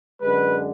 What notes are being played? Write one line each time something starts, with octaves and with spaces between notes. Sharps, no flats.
F#2 D3 G#3 B4